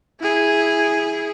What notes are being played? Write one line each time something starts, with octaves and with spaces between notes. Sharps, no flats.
E4 G#4